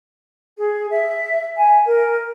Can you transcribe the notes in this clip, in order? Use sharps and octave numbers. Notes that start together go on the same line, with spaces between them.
G#4
E5
G#5
A#4